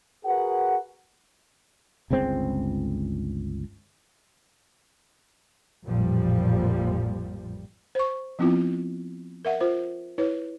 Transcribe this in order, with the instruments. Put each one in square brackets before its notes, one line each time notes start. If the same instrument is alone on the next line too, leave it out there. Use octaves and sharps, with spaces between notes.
[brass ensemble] F#4 G#4 A#4 B4 F#5
[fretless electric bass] G1 C#2 G#3 C4
[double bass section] A1 F2 A#2 F3 G3
[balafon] C5 C#6
F3 B3 C4 E4 F4
A#4 E5 F#5
F4 C5
E4 B4 C#5